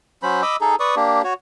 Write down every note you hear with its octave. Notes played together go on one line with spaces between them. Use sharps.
F#3 C#4 C5 B5
D#5 B5 D6 E6
D#4 G#4 A4
B4 D5 C#6 D#6
A#3 D4 G4
F#4 C#5